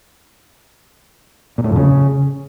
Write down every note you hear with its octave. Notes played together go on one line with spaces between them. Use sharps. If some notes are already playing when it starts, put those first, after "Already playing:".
A#2
A2
F2
C#3